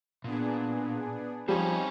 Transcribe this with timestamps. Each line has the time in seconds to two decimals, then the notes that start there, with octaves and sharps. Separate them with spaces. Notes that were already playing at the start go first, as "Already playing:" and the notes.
0.24 A#2 B3 D4 G#4
1.48 F3 G3 C4 D#4 C#5 G#5